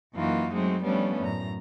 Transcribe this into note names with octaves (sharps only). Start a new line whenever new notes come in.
F#2 E3 A#3 D#4 F4 F#4
F#3 G#3 A3 C4 D#4
F3 G3 A3 B3 C#4 D4
F#2 A2 A#5